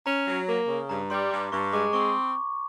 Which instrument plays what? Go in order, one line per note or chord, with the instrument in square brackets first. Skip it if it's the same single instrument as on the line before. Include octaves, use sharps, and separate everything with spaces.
[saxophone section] C#4 [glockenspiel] A#5
[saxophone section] F#3
A#3
C#3
[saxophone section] G2 [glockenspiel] A#5
[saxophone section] G3 [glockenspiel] C6
[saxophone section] G2 [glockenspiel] D6
[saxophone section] G2 [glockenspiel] C#6
[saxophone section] G#3 [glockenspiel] D6
[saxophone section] C4 [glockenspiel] C#6